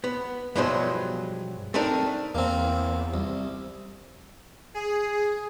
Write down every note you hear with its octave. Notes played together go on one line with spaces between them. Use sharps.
B3
G2 B2 F3 F#3 G#3 C5
A3 C4 D4 D#4 A#4
E2 A#3 C4
C2
G#4